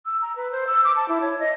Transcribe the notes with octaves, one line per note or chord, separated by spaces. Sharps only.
E6
A#5
B4
C5
E6
D6
A5
E4
C#5
D#5